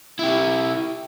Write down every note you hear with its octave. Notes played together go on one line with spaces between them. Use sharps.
E4 G4